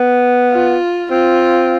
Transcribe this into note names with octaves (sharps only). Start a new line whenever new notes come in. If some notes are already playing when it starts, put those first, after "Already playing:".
Already playing: B3
F4
C4 F4